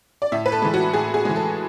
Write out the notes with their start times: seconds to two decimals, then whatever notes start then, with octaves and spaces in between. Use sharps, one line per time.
0.22 D5
0.32 A2 E5
0.46 B4
0.52 A4
0.62 E3 G#3
0.74 F#4
0.93 A2 G#4
1.14 G#4
1.25 E3 G#3
1.36 A4